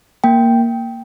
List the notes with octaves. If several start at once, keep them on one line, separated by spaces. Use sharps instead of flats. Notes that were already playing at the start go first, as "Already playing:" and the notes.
A#3 G5